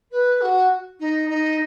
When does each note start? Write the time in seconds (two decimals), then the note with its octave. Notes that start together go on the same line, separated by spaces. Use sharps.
0.11 B4
0.41 F#4
0.99 D#4
1.29 D#4